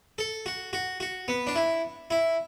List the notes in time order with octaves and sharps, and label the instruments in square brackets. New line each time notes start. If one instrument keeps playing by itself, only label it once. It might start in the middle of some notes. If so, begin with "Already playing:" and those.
[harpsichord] A4
F#4
F#4
F#4
B3
D4
E4
E4